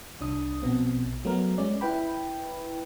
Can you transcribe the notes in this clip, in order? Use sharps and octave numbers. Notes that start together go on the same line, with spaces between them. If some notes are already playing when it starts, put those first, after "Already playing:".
C2 D4 D#6
A#1 B2 B3 C4
F#3 A3 B3 A#4
G#3 C#4 D5
E4 B4 G5 B5